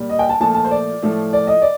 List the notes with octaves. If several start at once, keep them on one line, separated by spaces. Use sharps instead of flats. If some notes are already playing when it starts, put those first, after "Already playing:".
Already playing: A#2 G3
D#5
G5
A5
A#2 F3 A3 A5
A5
C5
D5
A2 F3 A3
D5
D#5
D5